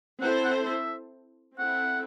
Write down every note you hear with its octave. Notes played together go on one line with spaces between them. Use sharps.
C4 E4 A4 C5 F#5
F#5
E5
C4 E4 A4 F#5